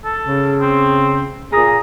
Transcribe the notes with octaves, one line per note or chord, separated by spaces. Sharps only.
A4
C#3
C4
A#2 G#4 A#5